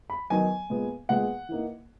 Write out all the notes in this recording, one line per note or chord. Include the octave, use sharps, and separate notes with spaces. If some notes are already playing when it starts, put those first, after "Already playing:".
B5
D#3 F#3 B3 D#4 G#5
A#2 G#3 B3
A#2 G#3 B3 F#5
E3 A#3 D#4